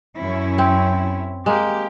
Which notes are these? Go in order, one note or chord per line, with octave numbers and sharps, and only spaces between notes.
F#2 C#4 E4
C4
G#3 A#3 G4